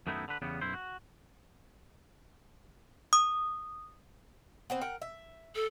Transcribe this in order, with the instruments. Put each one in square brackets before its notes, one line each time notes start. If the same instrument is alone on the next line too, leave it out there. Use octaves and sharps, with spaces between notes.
[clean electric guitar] F#2 D#3 A3 B3 D#4 E4
D3 B4
E2 C#3 G3 B3
B1 F#2 E4 C5
F#4
[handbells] D#6
[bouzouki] B3 C4 C5
A#4 F#5 G5
E5
[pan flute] A4